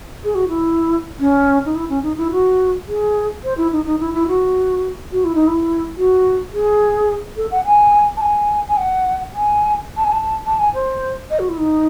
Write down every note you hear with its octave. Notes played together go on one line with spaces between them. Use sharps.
G#4
F#4
E4
C#4
D#4
E4
C#4
D#4
E4
F#4
G#4
C5
E4
D#4
D#4
E4
E4
F#4
F#4
E4
D#4
E4
F#4
G#4
A4
F#5
G#5
A5
G#5
G#5
F#5
G#5
A5
G#5
A5
A5
G#5
C5
D#5
F#4
E4
D#4